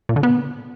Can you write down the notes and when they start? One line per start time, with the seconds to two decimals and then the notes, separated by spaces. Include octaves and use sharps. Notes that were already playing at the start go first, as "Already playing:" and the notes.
0.09 A#2
0.16 D3
0.23 B3